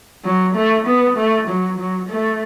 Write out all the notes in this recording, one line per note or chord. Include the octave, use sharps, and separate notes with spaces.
F#3
A3
B3
A3
F#3
F#3
A3